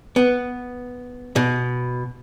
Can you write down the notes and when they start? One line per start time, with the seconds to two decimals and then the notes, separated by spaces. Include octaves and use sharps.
0.16 B3
1.36 B2